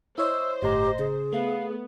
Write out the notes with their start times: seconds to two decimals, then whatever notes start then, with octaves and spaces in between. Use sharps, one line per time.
0.18 E4 C5 C#5 D#5 E6
0.62 G1 A2 G4 D#5 A#5
0.99 C#3 G#4
1.33 A3 B3 F5